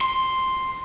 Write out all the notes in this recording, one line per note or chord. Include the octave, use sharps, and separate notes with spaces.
C6